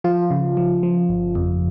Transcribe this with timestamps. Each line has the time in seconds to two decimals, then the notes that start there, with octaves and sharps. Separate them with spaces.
0.04 F3 F4
0.30 C#3
0.57 F3
0.83 F3
1.09 G1
1.35 F2